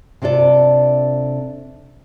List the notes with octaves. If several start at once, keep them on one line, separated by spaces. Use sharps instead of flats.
C3 D4 F4 A4 D5